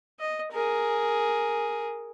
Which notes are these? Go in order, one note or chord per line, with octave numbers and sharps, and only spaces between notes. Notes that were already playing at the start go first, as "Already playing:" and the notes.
D#5
G#4 A#4